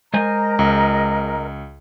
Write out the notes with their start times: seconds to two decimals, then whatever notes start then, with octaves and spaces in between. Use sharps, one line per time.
0.14 G#3 A#4 C5 D#5 G#5 A#5
0.59 C#2